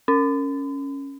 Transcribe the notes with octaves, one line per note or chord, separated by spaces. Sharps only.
C#4